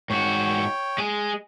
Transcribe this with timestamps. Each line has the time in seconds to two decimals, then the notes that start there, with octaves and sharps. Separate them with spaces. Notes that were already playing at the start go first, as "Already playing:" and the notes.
0.10 G#2 F#4 C#5 G5
0.98 G#3 G#4